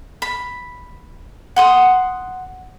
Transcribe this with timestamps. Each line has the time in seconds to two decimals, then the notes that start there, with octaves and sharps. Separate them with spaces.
0.22 B5
1.56 F#5 C6 D#6